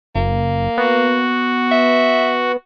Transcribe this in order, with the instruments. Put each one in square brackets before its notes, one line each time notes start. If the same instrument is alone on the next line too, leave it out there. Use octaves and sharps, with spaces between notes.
[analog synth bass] F#1 [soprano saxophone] A#3
[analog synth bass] B3 [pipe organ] F#4
[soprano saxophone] E5